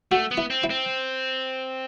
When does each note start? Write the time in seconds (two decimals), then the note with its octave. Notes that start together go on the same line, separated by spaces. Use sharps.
0.11 A3 F#4
0.31 B3
0.37 E4
0.50 C4
0.64 E4
0.70 C4